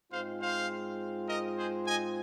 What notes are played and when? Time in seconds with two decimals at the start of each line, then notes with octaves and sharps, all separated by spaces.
0.12 G#2 G#3 C4 F4 C5 F5
0.41 C5 F5
1.28 A#4 D#5
1.57 G#4 C5
1.86 D#5 G#5